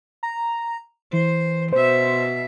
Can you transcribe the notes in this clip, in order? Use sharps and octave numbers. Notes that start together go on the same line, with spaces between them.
A#5
E3 C5
B2 C5 E5